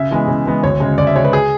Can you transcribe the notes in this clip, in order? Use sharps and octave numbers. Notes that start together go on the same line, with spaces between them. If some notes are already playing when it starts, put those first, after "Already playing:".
Already playing: C#3 E5
E3 G#3 B3
C#3
E3 G#3 B3
D2 C#5
C#3 G#3
D2 D5
E5
C#3 G#3 C#5
B4
G#4